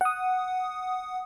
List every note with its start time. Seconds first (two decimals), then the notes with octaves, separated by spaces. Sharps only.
0.01 F#5 D#6